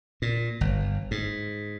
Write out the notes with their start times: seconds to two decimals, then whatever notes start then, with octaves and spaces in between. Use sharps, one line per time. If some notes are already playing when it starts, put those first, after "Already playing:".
0.22 A#2
0.61 G1
1.11 G#2